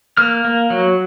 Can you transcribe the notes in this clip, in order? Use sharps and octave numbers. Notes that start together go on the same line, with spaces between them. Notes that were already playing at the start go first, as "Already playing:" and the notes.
A#3 F6
A#3
F#3